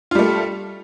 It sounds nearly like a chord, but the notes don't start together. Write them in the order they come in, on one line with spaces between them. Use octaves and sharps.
F4 G3 A3